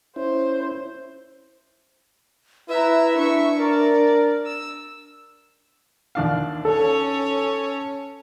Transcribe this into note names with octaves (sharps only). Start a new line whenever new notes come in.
C#4 E4 C5
E4 B4 E5 A#5
D4 E5 C#6
A#4 D5
E6
D#2 D4 F5
C#4 A4 C#5